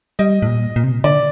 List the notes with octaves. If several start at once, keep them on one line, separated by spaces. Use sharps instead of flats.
G3 D#5
A2
A#2
A#2
C3
A#2
D3 D5